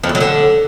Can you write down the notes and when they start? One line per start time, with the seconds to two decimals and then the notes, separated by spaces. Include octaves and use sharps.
0.03 F2
0.09 E2
0.15 F#3
0.20 D3